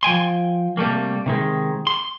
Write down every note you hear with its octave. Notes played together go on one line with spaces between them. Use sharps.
F3 G5 G#5 C6
C3 G3 A3 A#3
C3 D#3 G#3
C6